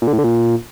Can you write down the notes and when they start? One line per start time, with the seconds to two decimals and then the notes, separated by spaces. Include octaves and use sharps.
0.02 A#2
0.07 D3
0.13 A2
0.18 D3
0.24 A#2